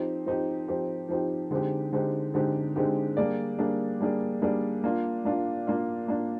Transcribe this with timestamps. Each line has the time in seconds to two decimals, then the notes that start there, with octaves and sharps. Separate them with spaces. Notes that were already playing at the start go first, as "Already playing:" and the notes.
Already playing: F3 C4 D#4 G4
0.26 F3 C4 D#4 G4
0.68 F3 C4 D#4 G4
1.09 F3 C4 D#4 G4
1.51 D3 G#3 C4 D#4 G4
1.93 D3 G#3 C4 D#4 G4
2.34 D3 G#3 C4 D#4 G4
2.76 D3 G#3 C4 D#4 G4
3.17 G3 A#3 D4 G#4 D5
3.59 G3 A#3 D4 G#4 D5
4.00 G3 A#3 D4 G#4 D5
4.42 G3 A#3 D4 G#4 D5
4.84 A#3 D4 F4
5.25 A#3 D4 F4
5.67 A#3 D4 F4
6.08 A#3 D4 F4